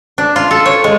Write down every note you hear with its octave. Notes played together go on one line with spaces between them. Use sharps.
D4
F4
A4
C#5
G#3